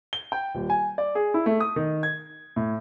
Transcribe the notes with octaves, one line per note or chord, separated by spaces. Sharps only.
G7
G5
D#1
G#5
D5
G#4
E4
A3
D#6
D#3
G#6
A2